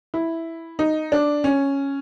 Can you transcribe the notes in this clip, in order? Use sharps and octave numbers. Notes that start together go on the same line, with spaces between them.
E4
D#4
D4
C#4